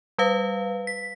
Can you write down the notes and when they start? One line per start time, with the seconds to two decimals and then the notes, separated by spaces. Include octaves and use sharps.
0.18 G3 B4 F5
0.87 B6